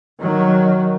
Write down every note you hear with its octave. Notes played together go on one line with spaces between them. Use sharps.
D#3 F#3